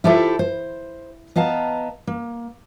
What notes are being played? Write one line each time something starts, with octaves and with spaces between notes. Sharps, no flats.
E4 F4 G4 A4 C5 E5
C5
B3 D#5 F5 A5 A#5
A#3